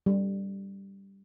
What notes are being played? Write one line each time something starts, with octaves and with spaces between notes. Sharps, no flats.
G3